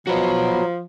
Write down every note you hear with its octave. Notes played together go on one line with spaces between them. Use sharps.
F3 F#3 F#4 B4